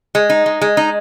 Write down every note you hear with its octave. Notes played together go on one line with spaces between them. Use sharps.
G#3
D#4
G#3
G#3
D#4